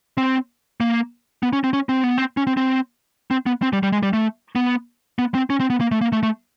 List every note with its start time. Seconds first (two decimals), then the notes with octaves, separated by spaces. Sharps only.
0.18 C4
0.80 A#3
1.43 B3
1.53 C#4
1.64 C4
1.73 C#4
1.89 C4
2.04 B3
2.18 C4
2.37 C#4
2.47 C4
2.57 C4
3.31 C4
3.46 B3
3.62 C4
3.73 G3
3.83 G3
3.92 G#3
4.03 G3
4.13 A3
4.56 B3
5.19 B3
5.35 C4
5.50 C#4
5.60 C4
5.70 B3
5.81 A#3
5.92 A3
6.01 A#3
6.12 A3
6.23 A3